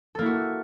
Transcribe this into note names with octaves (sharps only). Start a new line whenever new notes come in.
A#3 E4 F#4 A4